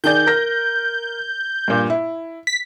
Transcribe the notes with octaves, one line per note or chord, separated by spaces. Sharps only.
D#3 G#4 D5 G6
A#4 A#6
G2 A#2
E4
B6